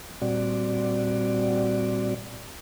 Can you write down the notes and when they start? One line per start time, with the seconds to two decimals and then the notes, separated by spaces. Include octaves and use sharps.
0.22 A#2 G3 C4 F#4 D5